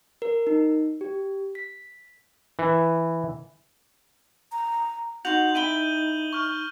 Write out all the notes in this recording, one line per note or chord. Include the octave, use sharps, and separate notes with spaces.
A#4
D#4
G4
B6
E3
A#5
D#4 F#4 C6 G6 F7 F#7
E4 G5 B5 D#7 G7
C#6 F6